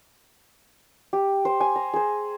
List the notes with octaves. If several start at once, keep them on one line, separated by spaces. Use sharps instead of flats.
G4
C5
G#5
A#5
G#4 C5